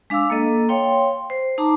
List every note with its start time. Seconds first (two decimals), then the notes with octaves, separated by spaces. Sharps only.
0.10 G#3 D4 F5 D6 E6
0.30 A#3 A4 D#5
0.69 C#5 F5 G5 C6
1.30 C5
1.58 D#4 A5 A#5 D6